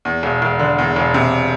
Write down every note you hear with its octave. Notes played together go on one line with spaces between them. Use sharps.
E2
E1
E1
D3
E2
E1
C3